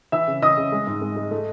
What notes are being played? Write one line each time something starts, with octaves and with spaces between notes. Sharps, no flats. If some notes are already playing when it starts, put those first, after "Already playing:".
E3 E5 E6
C#3
E3 D#5 D#6
C#3
G#3
G#2
G#3
G#3
A3